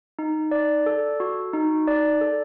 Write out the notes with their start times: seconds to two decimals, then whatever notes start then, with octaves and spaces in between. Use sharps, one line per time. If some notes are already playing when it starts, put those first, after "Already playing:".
0.19 D#4
0.51 D5
0.86 A4
1.20 F#4
1.53 D#4
1.88 D5
2.21 A4